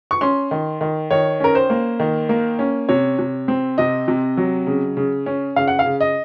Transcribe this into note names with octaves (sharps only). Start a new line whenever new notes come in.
C#6
C#4 C6
D#3
D#3
D#3 C#5
C#4 A#4
C5
A#3
D#3
A#3
C#4
C3 C#5
C3
C4
C3 D#5
C3
F#3
C#3
C#3
C#4
C#3 F5
F#5
F5
C#3
D#5